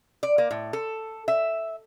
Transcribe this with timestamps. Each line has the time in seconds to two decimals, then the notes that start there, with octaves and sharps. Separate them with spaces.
0.23 D5
0.38 A#3
0.51 A2
0.73 A4
1.28 E5